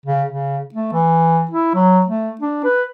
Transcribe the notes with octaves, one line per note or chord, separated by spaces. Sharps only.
C#3
C#3
A3
E3
E4
F#3
A3
D4
B4